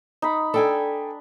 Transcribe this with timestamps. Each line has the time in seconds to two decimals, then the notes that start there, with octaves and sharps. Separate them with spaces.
0.22 D#4 B5
0.54 D4 A4 G5 G#5